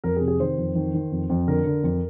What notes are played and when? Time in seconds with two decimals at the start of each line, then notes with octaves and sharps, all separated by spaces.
0.04 F2 A#4
0.16 G#4
0.21 C3
0.28 G#4
0.39 D#3 C5
0.58 F2
0.75 D#3
0.94 D#3
1.12 F2
1.30 F2
1.48 D3 A#4
1.66 D3
1.84 F2